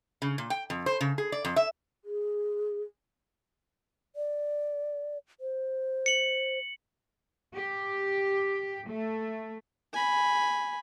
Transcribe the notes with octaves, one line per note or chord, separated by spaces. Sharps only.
C#3
A#2
G5
F2
C5
C#3
G#4
D5
F2
E5
G#4
D5
C5
C#7 F#7
G4
A3
G#5 B5